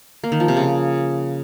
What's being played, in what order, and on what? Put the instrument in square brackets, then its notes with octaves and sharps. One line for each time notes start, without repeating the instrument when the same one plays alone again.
[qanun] A#3
D#3
F3
C3
C#3